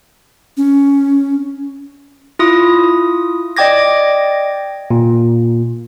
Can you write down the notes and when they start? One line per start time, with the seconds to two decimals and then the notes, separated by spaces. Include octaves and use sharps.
0.57 C#4
2.39 E4 F4 D#6
3.57 D5 D#5 G5 D6 G#6 A#6
4.91 A#2